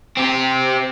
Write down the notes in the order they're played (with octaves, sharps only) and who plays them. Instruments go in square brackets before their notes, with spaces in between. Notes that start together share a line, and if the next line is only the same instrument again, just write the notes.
[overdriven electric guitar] C4 G4